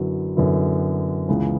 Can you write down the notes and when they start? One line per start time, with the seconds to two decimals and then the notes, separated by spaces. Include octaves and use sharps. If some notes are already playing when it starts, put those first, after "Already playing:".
Already playing: F#2 D3 F#3 B3 E4
0.37 F#2 D3 F#3 B3 E4
1.29 C#2 C#3 E3 B3